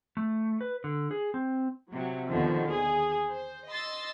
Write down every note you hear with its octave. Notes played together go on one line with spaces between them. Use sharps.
A3
B4
D3
G#4
C4
C3 F#3
D#2 B2 D3 D#3 F3
G#4
C5
D#5 C6 E6 A6